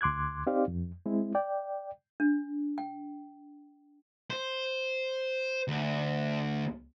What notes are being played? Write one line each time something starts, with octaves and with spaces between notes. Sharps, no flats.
D2 C6 D6 F#6 G#6
C4 D#4 G4 C5 D5 F5
F2
G#3 C4 E4
D5 G5
D4
G5
C5
D2